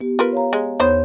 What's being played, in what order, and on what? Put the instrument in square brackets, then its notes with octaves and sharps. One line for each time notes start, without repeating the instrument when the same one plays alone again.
[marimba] B3 G4
[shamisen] F4 A#4 B4
[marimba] C#5 F5 A#5
[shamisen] G#3
[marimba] E2 C#5 G6 [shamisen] D#3 B3 C5